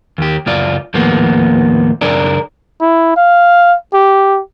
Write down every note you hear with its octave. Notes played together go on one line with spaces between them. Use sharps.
D#2 G4
C#2 F#2 F4 D5
D#2 A2 F3 G#3 A#3 B3
C#2 F#2 D4 G#4 A#4 D5
E4
F5
G4